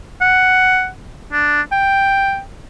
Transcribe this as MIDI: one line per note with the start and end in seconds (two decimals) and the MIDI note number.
0.21 0.88 78
1.32 1.61 62
1.72 2.40 79